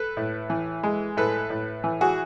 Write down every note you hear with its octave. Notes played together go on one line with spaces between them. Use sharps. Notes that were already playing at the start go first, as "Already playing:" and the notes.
Already playing: A4 B4
A2
E3
G#3
A2 A4 B4
A2
E3
F#4 G#4